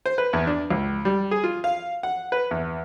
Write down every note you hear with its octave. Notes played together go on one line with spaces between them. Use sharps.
C5
B4
E2
D4
C#2
G3
G#4
F4
F5
F#5
B4
E2